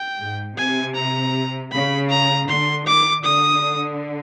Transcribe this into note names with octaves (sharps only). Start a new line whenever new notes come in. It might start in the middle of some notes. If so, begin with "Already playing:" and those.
Already playing: G5
G#2
C3 G#5
A#5
C#3 B5
A#5
D3 C6
D#3 D6
D3 D#6